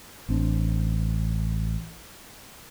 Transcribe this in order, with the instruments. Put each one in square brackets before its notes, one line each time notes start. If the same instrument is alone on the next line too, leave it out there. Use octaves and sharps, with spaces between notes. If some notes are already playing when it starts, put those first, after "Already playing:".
[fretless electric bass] A1 C4 D4